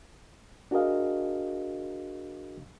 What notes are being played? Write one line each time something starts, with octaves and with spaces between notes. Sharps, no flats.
D4 F#4 G#4 A#4 D#5 F5